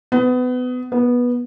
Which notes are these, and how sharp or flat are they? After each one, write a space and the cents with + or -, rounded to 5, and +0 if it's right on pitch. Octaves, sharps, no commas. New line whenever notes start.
B3 +25
B3 -15